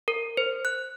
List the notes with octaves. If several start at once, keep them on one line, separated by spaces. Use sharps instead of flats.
A#4
C5
F#6